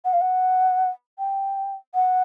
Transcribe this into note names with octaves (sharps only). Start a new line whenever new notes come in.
F#5
F5
F#5
G5
F#5